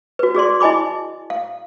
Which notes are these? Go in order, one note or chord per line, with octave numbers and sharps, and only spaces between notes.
F#4 B4
F#4 G#4 D5 C6
E4 D#5 G#5 B5 D6
F5